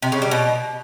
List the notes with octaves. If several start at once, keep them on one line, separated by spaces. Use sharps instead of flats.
C3
C#3
G3
B2